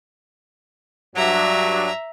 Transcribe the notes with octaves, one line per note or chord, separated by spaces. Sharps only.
G2 F#3 D4 E5 A#5